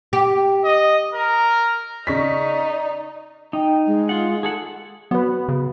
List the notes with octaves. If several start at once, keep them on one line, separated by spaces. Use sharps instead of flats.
G4
D#5
A#4
C#3 D#4 D5 C#6 B6
D#4 G5
G#3
F4 F#5
G#4 A4 F#5
F#3 B3 B4
C#3